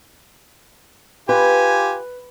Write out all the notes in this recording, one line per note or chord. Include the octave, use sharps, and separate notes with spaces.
F4 G4 B4 G#5